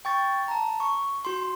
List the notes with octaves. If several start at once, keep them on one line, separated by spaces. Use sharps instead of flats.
G5 C#6 A6
A5 A#5
C#6
F#4 C6